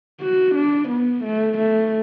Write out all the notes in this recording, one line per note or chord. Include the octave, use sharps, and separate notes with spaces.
F#4
D4
B3
A3
A3